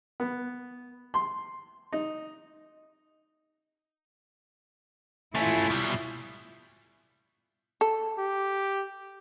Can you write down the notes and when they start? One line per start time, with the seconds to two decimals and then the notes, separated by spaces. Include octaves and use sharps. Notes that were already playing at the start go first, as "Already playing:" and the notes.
0.20 B3
1.14 C6
1.93 D#4
5.35 A3 C#4 E4 F4 E5
5.70 B2 G3
7.81 A4
8.18 G4